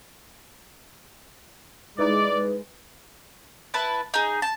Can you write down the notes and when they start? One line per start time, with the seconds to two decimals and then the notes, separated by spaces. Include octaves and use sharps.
1.98 G#3 D#4 E4 B4 D5
3.74 E4 B4 A5
4.14 D#4 G#4
4.42 A5